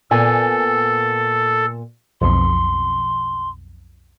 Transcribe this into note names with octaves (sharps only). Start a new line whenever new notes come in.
A#2 B3 A4 G#5
B1 F2 C6